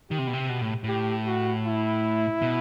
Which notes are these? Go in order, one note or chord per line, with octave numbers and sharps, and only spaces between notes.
D#3 G4
C3
B2
C3
B2
A2
A2 G4
F#4
E4
B2